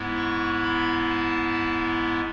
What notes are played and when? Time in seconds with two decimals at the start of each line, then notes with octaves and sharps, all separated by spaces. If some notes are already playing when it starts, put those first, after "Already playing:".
Already playing: G#2 G#3 B3 E4
0.17 C#6
0.63 B5
1.10 A5